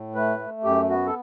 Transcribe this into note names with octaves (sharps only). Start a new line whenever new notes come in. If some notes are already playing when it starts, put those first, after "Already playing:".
Already playing: A2
A3 B4
A3
F#2 G4
B3 F#4
A4